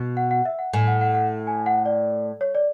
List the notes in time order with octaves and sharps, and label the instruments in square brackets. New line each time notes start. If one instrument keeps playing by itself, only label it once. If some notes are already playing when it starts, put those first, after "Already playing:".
Already playing: [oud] B2
[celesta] F#5
F#5
E5
F#5
[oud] A2 [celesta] G#5
[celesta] F#5
F#5
F#5
G#5
F#5
D5
C#5
D5